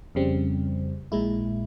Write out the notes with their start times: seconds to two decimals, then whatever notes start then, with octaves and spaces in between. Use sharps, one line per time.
0.15 F2 C#3 G3 C4
1.12 A#1 A#2 G#3 E4